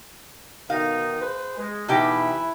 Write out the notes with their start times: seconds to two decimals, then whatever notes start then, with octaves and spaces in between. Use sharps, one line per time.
0.70 B2 D#3 D#4 F5
1.21 G#4 B4 C5
1.58 G#3
1.88 B2 E3 D#4 E4 G4 B4